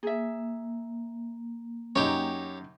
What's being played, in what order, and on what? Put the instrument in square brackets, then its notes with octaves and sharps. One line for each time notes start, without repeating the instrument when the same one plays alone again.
[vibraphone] A#3 [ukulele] G#4 E5
[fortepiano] F#2 D#4 [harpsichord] G4 C#5 [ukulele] G5